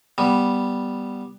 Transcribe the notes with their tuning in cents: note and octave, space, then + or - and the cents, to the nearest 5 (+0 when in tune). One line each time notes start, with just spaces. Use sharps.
G3 +0 B3 +0